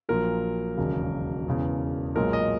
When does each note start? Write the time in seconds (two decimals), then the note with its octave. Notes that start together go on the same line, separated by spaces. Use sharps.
0.09 A#1 A#2 F#3 A#4
0.77 E1 D#2 C#3 F#3
1.46 E1 E2 C#3
2.15 B1 A#2 G#3 C#4 A#4
2.33 D#5